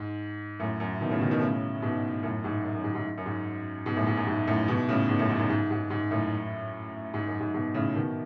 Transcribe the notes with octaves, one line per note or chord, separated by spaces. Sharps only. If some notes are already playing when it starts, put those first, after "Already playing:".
Already playing: G#2
F#2 A2
F#2
B2 D#3
A2 C#3
B2 D#3
B2 D#3
A2 C#3
G#2 B2
F#2 A2
G#2
F#2
F#2
G#2
G#2
F#2
G#2
G#2 B2
F#2 A2
G#2
F#2
G#2
F#2 A2
G#2 B2
A2 C#3
G#2 B2
F#2 A2
G#2
F#2
G#2
G#2
G#2
F#2 A2
G#2
F#2
G#2
G#2 B2
A2 C#3
B2 D#3